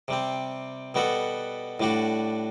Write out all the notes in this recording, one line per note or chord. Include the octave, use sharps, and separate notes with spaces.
C3 G3 C4
B2 G3 B3 F#4 A4
A2 G3 D4 F#4